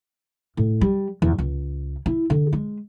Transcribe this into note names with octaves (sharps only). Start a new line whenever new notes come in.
A2
G3
E2
C#2
E4
D3
G#3